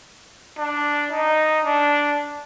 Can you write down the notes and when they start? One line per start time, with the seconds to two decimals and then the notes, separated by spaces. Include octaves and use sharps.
0.58 D4
1.12 D#4
1.65 D4